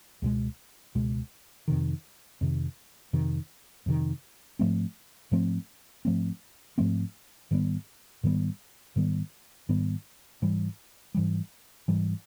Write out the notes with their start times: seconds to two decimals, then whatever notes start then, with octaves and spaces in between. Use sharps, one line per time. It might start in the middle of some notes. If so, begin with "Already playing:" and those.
0.22 C#2 B2 G#3
0.95 C#2 B2 G#3
1.68 F2 C3 D#3
2.41 F2 C3 D#3
3.13 F2 C3 D#3
3.86 F2 C3 D#3
4.59 G#2 F3 A3 C4
5.32 G#2 F3 A3 C4
6.05 G#2 F3 A3 C4
6.78 G#2 F3 A3 C4
7.51 G#2 D#3 G3 B3
8.24 G#2 D#3 G3 B3
8.96 G#2 D#3 G3 B3
9.69 G#2 D#3 G3 B3
10.42 G#2 E3 G3
11.15 G#2 E3 G3
11.88 G#2 E3 G3